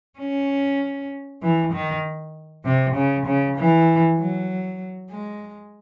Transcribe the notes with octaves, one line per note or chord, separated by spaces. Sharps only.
C#4
E3
D#3
C3
C#3
C#3
E3
F#3
G#3